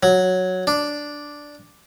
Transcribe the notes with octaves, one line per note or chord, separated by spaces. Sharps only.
F#3
D4